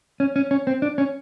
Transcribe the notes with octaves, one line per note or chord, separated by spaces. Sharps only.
C#4
C#4
C#4
C4
D4
C#4